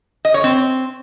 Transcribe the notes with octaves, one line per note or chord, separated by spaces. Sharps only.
D#5
C#5
C4